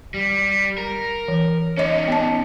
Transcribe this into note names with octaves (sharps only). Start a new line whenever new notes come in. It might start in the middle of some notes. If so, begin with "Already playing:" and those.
G3
A#4
E3
C#4 D#4 C#5 D#5
B3 A5